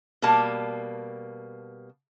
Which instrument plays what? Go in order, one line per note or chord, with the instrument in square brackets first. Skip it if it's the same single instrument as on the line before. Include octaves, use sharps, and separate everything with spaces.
[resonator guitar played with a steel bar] B2 G3 A#3 A5